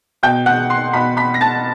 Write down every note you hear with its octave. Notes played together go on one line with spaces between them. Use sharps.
B2 G5 G6
F#5 F#6
C6 C7
B2 B5 B6
B5 B6
A#6
A5 A6